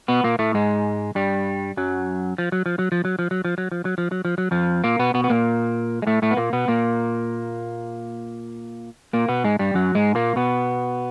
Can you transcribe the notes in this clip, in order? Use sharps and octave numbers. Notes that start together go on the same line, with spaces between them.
B2 B3
A#2 A#3
A2 A3
G#2 G#3
G2 G3
F#2 F#3
F3
F#3
F3
F#3
F3
F#3
F3
F#3
F3
F#3
F3
F#3
F3
F#3
F3
F#3
F2 F3
A#2 A#3
B2 B3
B2 B3
B3
A#2 A#3
G#3
A2 A3
A2 A3
B3
A#2 A#3
B2 B3
A#2 A#3
A#2 A#3
B2 B3
G#2 G#3
G2 G3
F#2 F#3
G#2 G#3
A#2 A#3
B2 B3